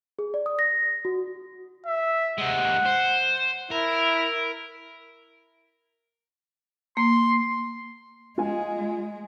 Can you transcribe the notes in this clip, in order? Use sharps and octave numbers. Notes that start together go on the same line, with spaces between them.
G#4
D5
D#6
A#6
F#4
E5
C3 G#3 F#5
C5
E4 A#4
A#3 C6
G#3 F4 G#5